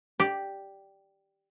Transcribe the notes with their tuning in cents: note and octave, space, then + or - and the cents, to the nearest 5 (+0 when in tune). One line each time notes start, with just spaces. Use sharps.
G4 +0 D5 +0